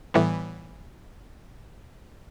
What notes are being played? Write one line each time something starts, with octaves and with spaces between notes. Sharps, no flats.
A2 E3 G3 B3